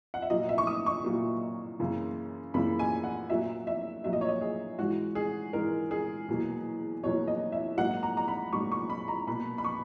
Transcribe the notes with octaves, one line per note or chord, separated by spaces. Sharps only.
F#5
E5
A#2 F#3 A#3 D#5
E5
C#6
D#6
C#6
A#2 F#3 A#3
F#2 C#3 E3 A#3
F#2 C#3 E3 A#3 B5
G#5
F#5
A#2 F#3 A#3 E5
E5
A#2 F#3 A#3 E5
D#5
C#5
D#5
G#4
G#2 E3 G#3 F#4
G#4
G#2 E3 G#3 A#4
G#4
E2 B2 F#3 A#3
E2 B2 F#3 A#3 C#5
D#5
E5
G#2 F#3 A#3 F#5
A#5
A#5
B5
G#2 F#3 A#3 C#6
C#6
B5
A#5
B2 A#3 B5
B5
C#6